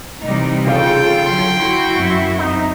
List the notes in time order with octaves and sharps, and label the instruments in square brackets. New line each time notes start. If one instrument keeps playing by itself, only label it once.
[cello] C3 E3 [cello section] G3 D#4
[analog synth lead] C#3 [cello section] F4 A4 [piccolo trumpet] G5
[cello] D3 F#3 [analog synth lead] C6
[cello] E4 F#4 [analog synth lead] C6
[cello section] F#2 E5
[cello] C4 [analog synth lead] D#4